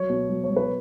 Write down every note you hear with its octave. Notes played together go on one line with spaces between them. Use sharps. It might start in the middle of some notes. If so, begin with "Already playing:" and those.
Already playing: F#3 C#5
B2
F#3
C#5
F#3
B4